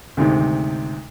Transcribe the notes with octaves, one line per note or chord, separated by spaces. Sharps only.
D2 G#2 C3 D#3